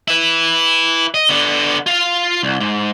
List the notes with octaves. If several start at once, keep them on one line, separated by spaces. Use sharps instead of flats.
E4 B4
D#5
D3 B3
F4 F5
C2
G#2